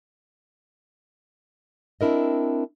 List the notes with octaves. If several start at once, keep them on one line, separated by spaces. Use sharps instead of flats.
C4 D4 E4 A#4 D#5